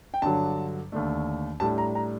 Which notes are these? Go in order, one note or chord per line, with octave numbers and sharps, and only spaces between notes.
G5
G2 D3 F#3 A5
D#2 D3 A3 D4
A2 G3 D4 A5
A#5
A#5